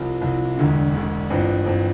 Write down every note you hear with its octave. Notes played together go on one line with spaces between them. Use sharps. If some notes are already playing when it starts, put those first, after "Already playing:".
Already playing: C2 C3 F3
C2 C3 F3
E1 D2 D3
E1 D2 D3
A1 G2 F3 C4
A1 G2 F3 C4